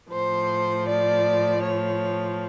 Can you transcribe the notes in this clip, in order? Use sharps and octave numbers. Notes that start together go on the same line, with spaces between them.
A2 F3 C5
D5
C#5